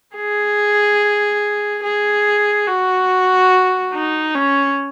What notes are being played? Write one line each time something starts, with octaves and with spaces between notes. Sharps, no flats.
G#4
G#4
F#4
D#4
C#4